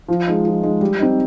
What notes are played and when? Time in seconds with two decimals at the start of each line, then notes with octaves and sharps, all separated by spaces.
0.08 F3
0.27 G#3 D#4
0.45 F3
0.63 G#3 D#4
0.81 G3
0.99 C4 D#4